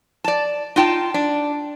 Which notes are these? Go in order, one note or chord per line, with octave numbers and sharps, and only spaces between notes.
D5 A5
D#4 F4 G5 A5
D4